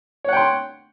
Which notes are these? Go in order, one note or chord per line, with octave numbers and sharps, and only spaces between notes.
C#5 F#5 G5 C6